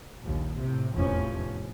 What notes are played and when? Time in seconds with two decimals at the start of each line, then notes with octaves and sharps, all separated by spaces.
0.24 A#1 D#2
0.60 A2 C3
0.94 F1 E2 A2 F3 C#4